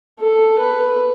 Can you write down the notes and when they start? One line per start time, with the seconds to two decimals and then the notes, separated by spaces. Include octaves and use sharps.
0.20 A4
0.58 B4